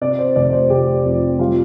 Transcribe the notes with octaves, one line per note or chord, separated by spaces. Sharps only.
C3 D5
C5
F1 D5
C5
F1 G4
F2
G3 F4